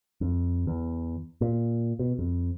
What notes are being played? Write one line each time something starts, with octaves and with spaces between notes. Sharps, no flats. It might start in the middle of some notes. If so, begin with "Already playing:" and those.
F2
E2
A#2
B2
F2